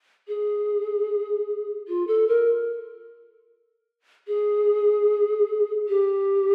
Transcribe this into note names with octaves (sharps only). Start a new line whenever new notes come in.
G#4
F4
A4
A#4
G#4
G4